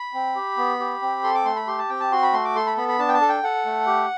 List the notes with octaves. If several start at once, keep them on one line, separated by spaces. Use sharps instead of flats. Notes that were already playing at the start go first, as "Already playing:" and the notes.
Already playing: B5
C4
G4
B3
G4
C4
A4 C6
D6
A3 C6
B5
G4 C6
A5
C4 G5
A5
F#4 C6
B5
A3 C6
D6
A4 C6
B5
B3 B5
B5
D4 A5
G5
A5
A4
G5
A4 F#5
A3
G4